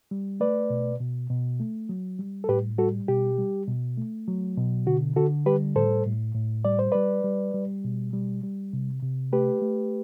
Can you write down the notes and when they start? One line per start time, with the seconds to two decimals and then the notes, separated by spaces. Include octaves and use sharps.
0.11 G3
0.40 A3 B4 D5
0.70 B2
1.00 B2
1.30 B2
1.60 A3
1.89 F#3
2.19 G3
2.44 A4
2.49 A2 G4 B4
2.78 G3 F#4 A4
3.08 B2 G4
3.38 G3
3.68 B2
3.98 A3
4.28 F#3
4.57 B2
4.86 D3 F#4
5.16 D3 F#4 A4
5.46 G3 G4 B4
5.76 A2 A4 C5
6.05 A2
6.35 A2
6.65 G3 D5
6.79 C5
6.92 G3 B4 D5
7.24 G3
7.54 G3
7.84 B2
8.13 G3
8.43 G3
8.73 C3
9.03 C3
9.33 A3 G4 B4
9.62 A3